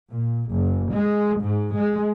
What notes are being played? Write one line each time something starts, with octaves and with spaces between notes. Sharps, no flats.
A#2
F#1
G#3
G#2
G#3